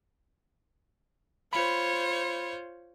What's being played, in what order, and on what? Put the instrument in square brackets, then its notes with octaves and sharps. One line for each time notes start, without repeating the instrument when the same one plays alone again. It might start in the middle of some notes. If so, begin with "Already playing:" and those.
[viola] F4 C5 [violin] C#5 [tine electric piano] B5